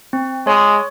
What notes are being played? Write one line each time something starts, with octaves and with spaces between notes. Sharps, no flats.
C4
G#3 C#5